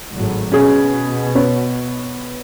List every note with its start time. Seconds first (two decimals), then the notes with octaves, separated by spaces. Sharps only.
0.13 G#1 A2 F#3
0.52 B2 C#4 G#4
1.35 B3 C#5